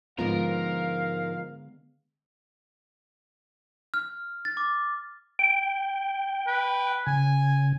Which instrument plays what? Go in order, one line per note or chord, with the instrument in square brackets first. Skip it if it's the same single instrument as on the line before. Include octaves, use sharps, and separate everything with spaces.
[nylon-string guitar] G#2 F3 F4 [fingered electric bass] D3 G#3 B3 [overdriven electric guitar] A#4 [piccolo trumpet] F5
[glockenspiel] F6
A6
D6
[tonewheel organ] G5
[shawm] B4
[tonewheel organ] C#3 [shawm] G#5